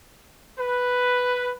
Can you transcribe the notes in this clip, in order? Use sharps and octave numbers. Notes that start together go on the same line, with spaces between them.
B4